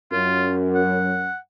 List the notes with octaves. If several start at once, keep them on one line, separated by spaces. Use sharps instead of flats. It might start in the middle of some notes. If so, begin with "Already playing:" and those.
F#2 F4
F#5